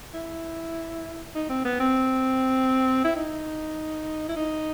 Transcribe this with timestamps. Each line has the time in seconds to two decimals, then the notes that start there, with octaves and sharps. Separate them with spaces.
0.14 E4
1.35 D#4
1.49 C4
1.65 B3
1.80 C4
3.04 E4
3.16 D#4
4.29 E4
4.36 D#4